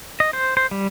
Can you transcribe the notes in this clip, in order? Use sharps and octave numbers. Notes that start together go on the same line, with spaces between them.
D#5
C5
C5
G3